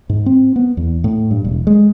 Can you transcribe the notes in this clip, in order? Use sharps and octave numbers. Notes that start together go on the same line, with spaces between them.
G#2
C4
B3
E2
A2
G2
E1
G#3